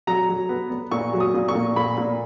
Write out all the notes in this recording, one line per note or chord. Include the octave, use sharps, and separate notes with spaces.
F#3 A#5
F#3
B3
B3
A#2 C#6
F#3
D#6
A#2
C#6
A#2
A#2 B5
A#2